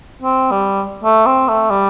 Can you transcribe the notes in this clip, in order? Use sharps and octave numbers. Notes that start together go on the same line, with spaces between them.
C4
G3
A3
C4
A3
G3